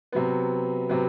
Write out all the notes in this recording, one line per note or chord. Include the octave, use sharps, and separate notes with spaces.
C3 F#3 B3
C3 F#3 B3